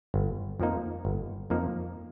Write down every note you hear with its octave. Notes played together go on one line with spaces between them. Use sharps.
G1
F2 F3 A#3 D#4
G1
F2 F3 A#3 D#4